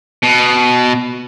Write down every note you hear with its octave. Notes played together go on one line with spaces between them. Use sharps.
B2